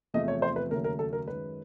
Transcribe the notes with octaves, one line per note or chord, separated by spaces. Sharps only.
E2 C3 F3 A3 D#5
C#5
C5
B4
D#2 C#3 F#3 A3 A#4
A#4
A4
A#4
F#2 D#3 G#3 B4